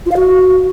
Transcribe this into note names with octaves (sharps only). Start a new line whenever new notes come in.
F4
F5
F#4